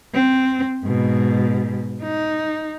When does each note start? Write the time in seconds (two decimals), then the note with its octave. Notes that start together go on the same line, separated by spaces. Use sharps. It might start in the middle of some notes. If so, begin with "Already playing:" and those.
0.14 C4
0.84 G#2 B2
2.02 D#4